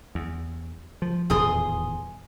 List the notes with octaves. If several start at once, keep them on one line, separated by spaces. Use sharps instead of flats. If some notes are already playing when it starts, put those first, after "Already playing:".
E2
F3
D#1 E2 A2 G#4 C6 D#6